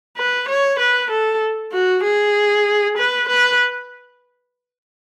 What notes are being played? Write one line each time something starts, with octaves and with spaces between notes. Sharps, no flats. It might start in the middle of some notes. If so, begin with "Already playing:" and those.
B4
C#5
B4
A4
F#4
G#4
B4
B4